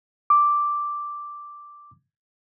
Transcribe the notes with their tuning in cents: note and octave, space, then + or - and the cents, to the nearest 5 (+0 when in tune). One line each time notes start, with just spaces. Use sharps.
D6 +0